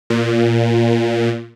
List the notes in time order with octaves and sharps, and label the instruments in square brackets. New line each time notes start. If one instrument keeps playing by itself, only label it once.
[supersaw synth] A#2